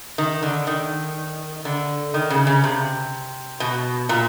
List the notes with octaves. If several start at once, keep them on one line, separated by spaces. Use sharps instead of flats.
D#3
D3
D#3
D3
D#3
C#3
C#3
C3
B2
A#2